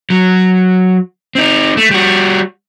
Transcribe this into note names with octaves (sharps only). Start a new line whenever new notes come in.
F#3
C4 D#4
A3
G3 F#4